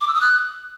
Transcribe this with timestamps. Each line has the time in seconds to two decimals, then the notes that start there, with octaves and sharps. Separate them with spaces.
0.01 D6
0.08 E6
0.14 D#6
0.21 F#6